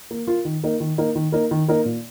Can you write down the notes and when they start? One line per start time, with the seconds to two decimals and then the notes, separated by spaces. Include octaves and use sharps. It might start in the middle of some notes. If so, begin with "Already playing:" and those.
0.11 A#3
0.27 F4 A#4
0.45 D#3
0.64 A#3 D#4 A#4
0.80 D#3
0.98 A#3 D#4 A#4
1.15 D#3
1.32 A#3 D#4 A#4
1.51 D#3
1.68 A#3 D#4 A#4
1.85 A#2